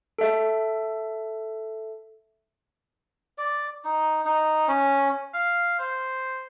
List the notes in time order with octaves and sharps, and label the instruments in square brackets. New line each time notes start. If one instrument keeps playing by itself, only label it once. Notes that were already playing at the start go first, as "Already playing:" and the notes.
[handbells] A4 E5
[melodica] D5
D#4
D#4
C#4
[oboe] F5
C5